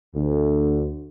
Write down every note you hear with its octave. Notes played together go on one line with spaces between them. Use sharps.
D2